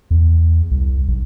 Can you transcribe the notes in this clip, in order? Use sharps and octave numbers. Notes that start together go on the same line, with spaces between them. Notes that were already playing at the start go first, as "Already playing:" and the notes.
E2
C2
B1